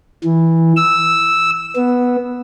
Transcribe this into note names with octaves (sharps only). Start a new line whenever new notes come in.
E3
E6
B3